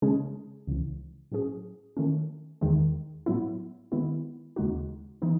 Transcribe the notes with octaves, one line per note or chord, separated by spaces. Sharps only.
C#3 G#3 C#4 G#4
C#2 C#3 E3
A2 F#3 C#4 G#4
D#3 A3 C#4
E2 D#3 G#3
A2 F#3 B3 E4
D#3 G#3 B3 E4
D#2 C#3 G#3 D#4 F#4
E3 B3 D#4